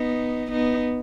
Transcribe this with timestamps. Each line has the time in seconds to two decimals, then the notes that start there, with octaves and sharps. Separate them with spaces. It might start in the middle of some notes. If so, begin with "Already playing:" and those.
Already playing: B3 D#4
0.51 B3 D#4